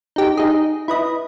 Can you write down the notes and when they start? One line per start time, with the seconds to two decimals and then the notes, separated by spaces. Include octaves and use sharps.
0.16 D#4 G4
0.37 D#4 G#4
0.88 E4 B4 D#5